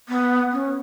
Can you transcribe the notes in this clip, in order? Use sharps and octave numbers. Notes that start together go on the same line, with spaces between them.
B3
C#4